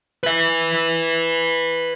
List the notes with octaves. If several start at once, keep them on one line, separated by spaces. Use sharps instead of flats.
B4 E5